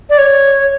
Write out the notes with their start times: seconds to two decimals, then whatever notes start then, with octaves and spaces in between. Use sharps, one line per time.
0.10 D5
0.18 C#5